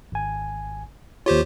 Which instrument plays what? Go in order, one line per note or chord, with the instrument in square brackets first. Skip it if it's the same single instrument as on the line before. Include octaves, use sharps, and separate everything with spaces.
[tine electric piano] G#1 G#5
[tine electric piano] D#2 C#5 [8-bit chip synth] F4 G4 C5